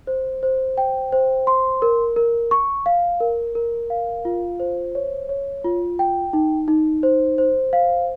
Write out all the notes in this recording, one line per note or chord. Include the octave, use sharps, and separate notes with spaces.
C5
C5
G5
C5
C6
A#4
A#4
C#6
F5
A#4
A#4
F5
F4
C5
C#5
C#5
F4
G5
D#4
D#4
C5
C5
F5